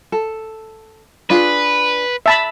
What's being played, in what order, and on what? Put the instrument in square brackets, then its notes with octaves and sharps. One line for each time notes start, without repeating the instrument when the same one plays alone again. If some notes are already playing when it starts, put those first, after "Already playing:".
[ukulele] A4
[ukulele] D4 F4 G#4 [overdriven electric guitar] B4
[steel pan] E5 A5 B5